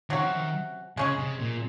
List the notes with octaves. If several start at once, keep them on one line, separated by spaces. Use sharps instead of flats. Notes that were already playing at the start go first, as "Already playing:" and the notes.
C3 D#3 F#3 C#4 F#4
F3
D#3
C#3 G#3 C#4 G#4
C3
A#2